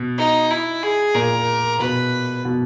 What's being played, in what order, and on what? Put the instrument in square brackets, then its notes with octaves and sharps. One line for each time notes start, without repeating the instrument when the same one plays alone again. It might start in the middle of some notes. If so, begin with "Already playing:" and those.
Already playing: [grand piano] B2
[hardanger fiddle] D#4
E4
G#4
[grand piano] A#2 [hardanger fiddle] A#4
[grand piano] B2 [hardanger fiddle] B4
[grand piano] B2